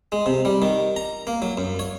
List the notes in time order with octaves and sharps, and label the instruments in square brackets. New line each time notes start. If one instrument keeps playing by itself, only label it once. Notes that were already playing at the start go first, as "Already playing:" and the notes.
[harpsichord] G#3
C3
G3
D#3
A#5
A#3
F#3
F#2
C#5